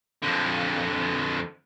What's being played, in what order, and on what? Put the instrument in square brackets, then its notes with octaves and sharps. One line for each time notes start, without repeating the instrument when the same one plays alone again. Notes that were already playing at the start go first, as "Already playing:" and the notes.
[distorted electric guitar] F2 D3